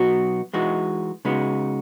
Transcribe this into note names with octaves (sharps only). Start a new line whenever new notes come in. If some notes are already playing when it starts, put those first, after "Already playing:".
Already playing: B2 F#3 B3 D#4 F#4
E3 G#3 D#4 F#4
C#3 G#3 B3 D#4 F#4